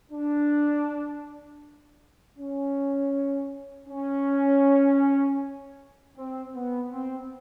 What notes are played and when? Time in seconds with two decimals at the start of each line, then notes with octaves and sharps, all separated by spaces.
0.11 D4
2.38 C#4
3.88 C#4
6.17 C4
6.54 B3
6.91 C4